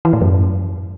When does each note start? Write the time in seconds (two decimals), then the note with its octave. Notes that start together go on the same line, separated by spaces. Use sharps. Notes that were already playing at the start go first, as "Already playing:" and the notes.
0.05 E3
0.13 A2
0.21 F#2